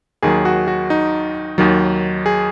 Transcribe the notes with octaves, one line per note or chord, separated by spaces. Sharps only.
D#2 D#3 F#3 G#4
F#4
F#4
D#4
D#2 D#3 F#3
G#4